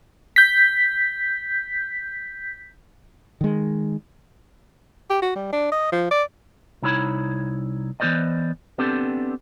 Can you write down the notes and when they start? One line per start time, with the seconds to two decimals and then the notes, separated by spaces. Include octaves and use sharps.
0.36 G6 B6
3.41 D#3 G#3
5.10 G4
5.22 F#4
5.35 G3
5.52 D4
5.72 D#5
5.92 F3
6.11 D5
6.82 C2 D#4 E4 C#5 B5
8.00 E3 B3 F#4 C5 D5 D#5
8.78 B3 C4 D4 G4 A4